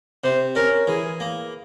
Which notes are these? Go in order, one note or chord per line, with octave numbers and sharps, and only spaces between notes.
C3 C5
C#4 A#4
E3 G#4
A#3